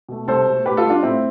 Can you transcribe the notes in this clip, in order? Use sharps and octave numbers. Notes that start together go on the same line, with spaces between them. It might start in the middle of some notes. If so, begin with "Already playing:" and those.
B2 A3
C2 A4 C5
B2 A3
A2 G4 B4
F4 A4
G3
D4 F4
A2 C4 E4